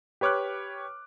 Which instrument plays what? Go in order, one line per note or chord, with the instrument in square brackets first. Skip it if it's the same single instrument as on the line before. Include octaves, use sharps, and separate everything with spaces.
[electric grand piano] G4 B4 C#5 D6 F6 F#6